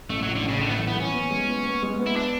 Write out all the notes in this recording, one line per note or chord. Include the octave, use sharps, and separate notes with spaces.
A1 A3
F#3
A2
D3
A1 C#3
A2 D3
B3
A3
E3
B3
E3 C#4
B3
G#3
B3
B3
G#3
B3
E4
D4